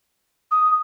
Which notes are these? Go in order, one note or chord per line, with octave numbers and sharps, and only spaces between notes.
D#6